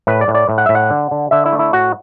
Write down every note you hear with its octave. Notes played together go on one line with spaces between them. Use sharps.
A2 B4
D5
A2
D5
A2
F#5
A2 E5
F#5
D3
D3
D3 E5
E4
A3
E4
A2 F#4